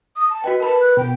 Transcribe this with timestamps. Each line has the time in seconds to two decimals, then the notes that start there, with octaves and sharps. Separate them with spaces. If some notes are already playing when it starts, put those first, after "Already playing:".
0.16 D#6
0.30 A5
0.44 F#4 B4 D#5 G5
0.60 A#4 B4 A5 B5
0.81 F#6
0.97 B2 G5